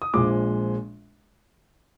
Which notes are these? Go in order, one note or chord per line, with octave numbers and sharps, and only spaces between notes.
D#6
A#1 A#2 F3 G#3 D6